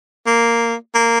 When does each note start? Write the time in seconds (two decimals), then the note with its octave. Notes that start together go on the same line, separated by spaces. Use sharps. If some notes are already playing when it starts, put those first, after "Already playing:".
0.27 A#3
0.94 A#3